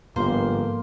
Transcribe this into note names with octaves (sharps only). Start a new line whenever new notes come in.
G1 G#2 F3 A#3 B3 C5